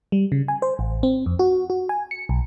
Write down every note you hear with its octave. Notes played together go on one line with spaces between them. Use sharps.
G3
C#3
G#5
C5
A1
C4
F2
F#4
F#4
G#5
C#7
B1